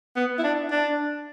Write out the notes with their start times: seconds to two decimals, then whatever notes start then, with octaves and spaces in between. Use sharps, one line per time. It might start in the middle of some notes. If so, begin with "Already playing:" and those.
0.16 B3
0.38 E4
0.44 D4
0.71 D4